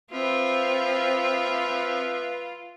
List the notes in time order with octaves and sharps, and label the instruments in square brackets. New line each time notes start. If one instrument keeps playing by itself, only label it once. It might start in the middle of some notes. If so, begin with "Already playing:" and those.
[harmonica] F3 E5 [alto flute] C4 [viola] F4 [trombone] B4